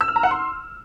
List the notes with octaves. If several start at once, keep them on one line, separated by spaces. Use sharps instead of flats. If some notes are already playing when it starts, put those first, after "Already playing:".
E6
F6
A#5
F#5
C6